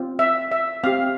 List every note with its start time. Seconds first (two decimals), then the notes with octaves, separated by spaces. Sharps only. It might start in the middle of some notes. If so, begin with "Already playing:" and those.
Already playing: C4 F4
0.19 E5
0.51 E5
0.84 C4 G4 F5